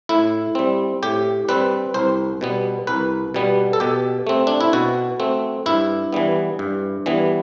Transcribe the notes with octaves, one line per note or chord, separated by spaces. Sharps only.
A2 E4
G3 C4
A2 G4
G3 C4 B4
C2 C5
B2 G3 B3
C2 B4
B2 G3 B3
A4
B2 G4
A3 C4
D4
E4
B2 F#4
A3 C4
G2 E4
E3 G3 B3
G2
E3 G3 B3